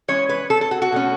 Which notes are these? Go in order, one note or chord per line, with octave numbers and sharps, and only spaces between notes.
E3 G#3 C#4 C#5
B4
A4
A4
F#4
F#4
B2 A3 C#4